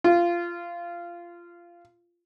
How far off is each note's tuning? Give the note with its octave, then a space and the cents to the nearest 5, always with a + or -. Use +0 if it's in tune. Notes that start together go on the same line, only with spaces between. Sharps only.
F4 -15